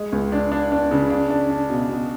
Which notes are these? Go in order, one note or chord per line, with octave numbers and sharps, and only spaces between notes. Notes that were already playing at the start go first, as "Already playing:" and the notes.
Already playing: G#3
C#2
D4
D4
D4
C#3
D4
D4
D4
B2
B2